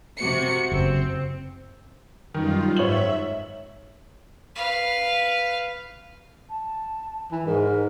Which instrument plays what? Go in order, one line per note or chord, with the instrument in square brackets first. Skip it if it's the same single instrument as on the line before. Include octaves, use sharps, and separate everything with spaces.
[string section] C3 F#4 C#7
[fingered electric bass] F#1 [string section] C4
[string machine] F#2 G3 F4 [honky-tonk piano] D#3
[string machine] G#2 E5 [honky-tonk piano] C#5 F#7
[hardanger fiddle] B4 F5
[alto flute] A5
[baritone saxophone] E3
[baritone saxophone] G#2 [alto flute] A#4